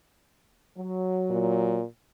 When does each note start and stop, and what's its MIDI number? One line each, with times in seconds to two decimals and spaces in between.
0.78 1.79 54
1.30 1.84 46